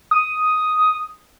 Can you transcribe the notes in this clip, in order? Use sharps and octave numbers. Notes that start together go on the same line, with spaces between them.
D#6